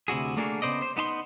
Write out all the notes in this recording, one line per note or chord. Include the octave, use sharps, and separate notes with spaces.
D2 C3 E4 F#4 G#4
A3 A#3 D4 F#4 G#4 A#4
C#3 F#3 B3 C5 D5 D#5
C5
B3 D#4 A5 C6